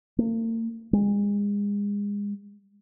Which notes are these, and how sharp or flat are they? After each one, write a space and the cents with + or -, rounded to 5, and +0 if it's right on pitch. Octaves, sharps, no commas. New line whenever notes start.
A#3 -45
G#3 -30